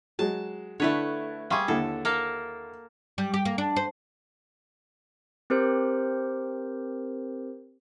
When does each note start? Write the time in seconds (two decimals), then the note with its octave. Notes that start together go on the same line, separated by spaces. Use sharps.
0.19 F#3 G#3 A5
0.80 D3 A3 D4 E4 B4 C#5
1.50 G3 G#4 F5 C6 C#6
1.68 D#2 D3 E4 A4
2.05 A#3 A4 A#4
3.18 G3
3.34 G4
3.45 A#3
3.58 D4
3.76 C5
5.50 C4 G4 A#4 C5